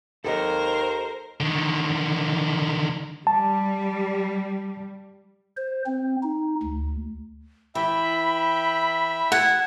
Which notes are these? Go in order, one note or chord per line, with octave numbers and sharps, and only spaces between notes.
D#2 A4 A#4 C5 D#5
D3 D#3
G3 A5
C5
C4
D#4
D2
E3 E5 G5 B5
F#5 A5 G#6